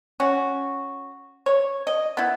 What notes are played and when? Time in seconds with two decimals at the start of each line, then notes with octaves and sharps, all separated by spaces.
0.20 C#4 F#4
1.46 C#5
1.87 D#5
2.17 B3 E4